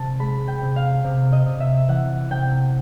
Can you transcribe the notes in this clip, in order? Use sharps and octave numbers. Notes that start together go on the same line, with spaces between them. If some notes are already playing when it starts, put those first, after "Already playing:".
Already playing: C3 A5
G#3 B5
G5
C3
F5
C3
D#5
C3
E5
E3 F#5
C3 G5